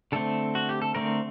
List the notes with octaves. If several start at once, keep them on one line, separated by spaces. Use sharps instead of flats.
D3 A3 C4 A4
F#4
G4
A4
D3 A3 C4 A#4